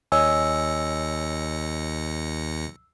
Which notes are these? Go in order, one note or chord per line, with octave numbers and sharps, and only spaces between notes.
D#2 C#5 D#5 G#5 E6 A#6 C#7